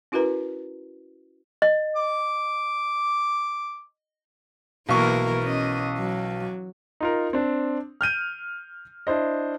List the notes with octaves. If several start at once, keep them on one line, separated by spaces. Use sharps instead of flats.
C#4 E4 F#4 A#4 B4 A#5
D#5
D6
B1 E3 A#3 A#4 C#6
C#4 D#5
F#3
D#4 F4 A#4
C4 D4
F6 G6 D#7
D4 E4 C5 D#5